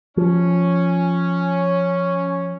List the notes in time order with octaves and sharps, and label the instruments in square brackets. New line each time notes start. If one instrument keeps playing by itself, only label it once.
[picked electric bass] F3 [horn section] C#4